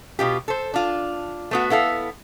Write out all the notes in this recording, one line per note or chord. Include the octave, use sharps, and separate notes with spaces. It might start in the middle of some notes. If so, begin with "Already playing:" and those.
B2 F4 G4
A4 C5
D4 F4
A3 B3 F#4
B3 E4 A4 F5